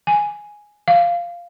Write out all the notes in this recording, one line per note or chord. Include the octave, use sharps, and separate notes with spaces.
G#5
F5